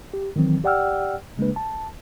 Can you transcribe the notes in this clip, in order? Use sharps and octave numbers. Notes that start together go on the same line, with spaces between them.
G4
D#3 E3 F#3 C4
G4 D5 F#5 G5 E6 F6
C#3 G#3 A#3 D4 B4
A5